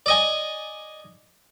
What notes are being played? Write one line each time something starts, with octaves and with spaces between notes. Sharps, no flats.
D5 D#5 G#5